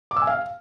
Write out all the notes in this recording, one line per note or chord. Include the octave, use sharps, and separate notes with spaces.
D6
E6
G#5
F5